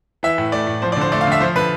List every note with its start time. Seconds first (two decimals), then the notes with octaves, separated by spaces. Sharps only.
0.23 E3 E5
0.38 A2
0.52 A3 D5
0.67 A2
0.82 F3 C5
0.92 D5
0.97 D3 C5
1.12 A3 D5
1.21 F5
1.27 D3
1.32 E5
1.40 F3 C5
1.55 D3 B4